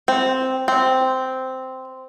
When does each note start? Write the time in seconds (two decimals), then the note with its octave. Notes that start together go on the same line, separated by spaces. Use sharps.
0.08 C4
0.68 C4